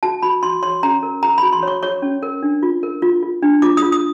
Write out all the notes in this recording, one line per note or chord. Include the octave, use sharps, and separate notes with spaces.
F#4 A5
F#4 B5
F#4 C6
C#5 C6
C#4 A#5
A#4
A#4 A#5
B5
F#4
C6
C#5 C#6
C#5 C#6
C#4
A#4
D4
F4
A#4
F4
F4
D4
F4 D6
D#6
F4
D#6